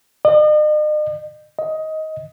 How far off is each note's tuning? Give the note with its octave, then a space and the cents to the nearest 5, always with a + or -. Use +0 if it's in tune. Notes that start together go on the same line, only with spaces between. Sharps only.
D#5 -45
D#5 +15